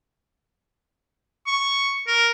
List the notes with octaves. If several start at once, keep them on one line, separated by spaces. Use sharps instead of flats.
C#6
A#4